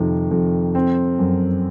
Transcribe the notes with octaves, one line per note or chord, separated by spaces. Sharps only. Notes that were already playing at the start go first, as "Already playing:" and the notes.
Already playing: F2 C3 D#3
F2
C4
F#2